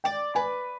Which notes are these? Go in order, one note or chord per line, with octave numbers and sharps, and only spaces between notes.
D5 G5
B4 G#5